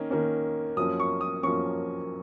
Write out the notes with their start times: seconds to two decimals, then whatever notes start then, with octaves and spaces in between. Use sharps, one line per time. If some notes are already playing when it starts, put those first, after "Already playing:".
Already playing: D#3 A#3 C#4
0.10 D#3 A#3 C#4
0.77 F#2 F3 A#3 C#4 D#6
1.00 C#6
1.21 D#6
1.43 F#2 F3 A#3 C#4 C#6